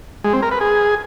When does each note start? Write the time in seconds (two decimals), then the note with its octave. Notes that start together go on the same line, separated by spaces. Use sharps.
0.24 G#3
0.33 C4
0.42 A#4
0.52 B4
0.61 G#4